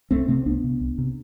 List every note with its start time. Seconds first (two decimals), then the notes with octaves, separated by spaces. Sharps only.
0.11 C2 A3 C4
0.28 C3 A3 C4
0.46 C2 B3 D4
0.64 C3
0.80 C2
0.98 C3